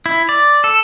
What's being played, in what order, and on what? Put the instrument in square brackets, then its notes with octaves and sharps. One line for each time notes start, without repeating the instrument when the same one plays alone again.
[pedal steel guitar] E4
D5
A4